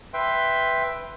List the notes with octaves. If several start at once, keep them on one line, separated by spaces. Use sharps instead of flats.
B4 E5 G5 C6